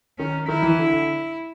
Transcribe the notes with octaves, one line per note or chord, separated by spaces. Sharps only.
D#3 C#4
D#3 E4
E3
D3
D3